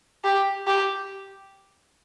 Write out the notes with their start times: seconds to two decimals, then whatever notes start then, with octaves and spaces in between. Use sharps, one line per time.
0.24 G4
0.67 G4